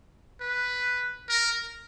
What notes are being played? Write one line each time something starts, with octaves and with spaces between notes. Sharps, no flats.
B4
A#4